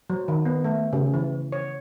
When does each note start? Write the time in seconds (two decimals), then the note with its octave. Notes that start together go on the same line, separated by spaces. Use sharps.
0.10 F#3
0.28 D#3
0.45 B3
0.64 A3
0.93 C#3
1.14 E3
1.52 C#5